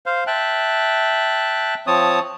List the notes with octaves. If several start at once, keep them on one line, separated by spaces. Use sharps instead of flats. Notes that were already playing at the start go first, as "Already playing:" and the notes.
C5 F5
E5 G5 A5 F#6
F3 C4 C#5 A5 D#6